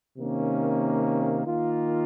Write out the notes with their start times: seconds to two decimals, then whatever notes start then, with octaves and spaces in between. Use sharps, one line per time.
0.18 C3 D#3 A#3 C#4
1.46 D#3 A#3 F4